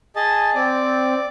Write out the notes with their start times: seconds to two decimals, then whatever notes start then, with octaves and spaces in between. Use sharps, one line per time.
0.16 G#4 D#5 A5
0.55 C4 D5